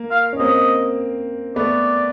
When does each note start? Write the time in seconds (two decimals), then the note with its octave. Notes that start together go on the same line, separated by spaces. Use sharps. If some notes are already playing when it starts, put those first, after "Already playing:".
Already playing: A#3
0.11 F5
0.33 C#4
0.39 A#3 C4 D#5
1.56 A3 B3 D5